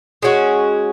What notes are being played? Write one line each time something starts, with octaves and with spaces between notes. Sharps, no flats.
G#3 C#4 F#4